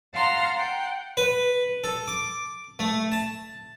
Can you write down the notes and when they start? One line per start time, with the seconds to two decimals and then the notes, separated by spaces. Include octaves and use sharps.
0.14 F5 F#5 A5 A#5 C6 F6
0.54 F#5 G5
1.17 B4
1.84 A4
2.08 D6
2.79 A3
3.12 A5